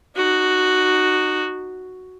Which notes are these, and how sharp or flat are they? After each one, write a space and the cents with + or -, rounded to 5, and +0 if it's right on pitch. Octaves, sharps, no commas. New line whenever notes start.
D#4 -25 F#4 +0